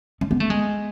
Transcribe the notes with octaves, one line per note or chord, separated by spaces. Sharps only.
C#4
B3
A3
G#3